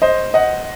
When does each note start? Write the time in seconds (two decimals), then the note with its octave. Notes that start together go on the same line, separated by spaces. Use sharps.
0.02 C5 D#5
0.34 D#5 F#5